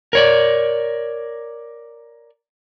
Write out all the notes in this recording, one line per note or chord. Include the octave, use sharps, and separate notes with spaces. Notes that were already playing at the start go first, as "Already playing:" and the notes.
A#4 C#5 D5